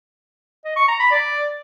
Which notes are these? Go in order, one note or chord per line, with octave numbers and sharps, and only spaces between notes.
D#5
C#6
A#5
B5
D5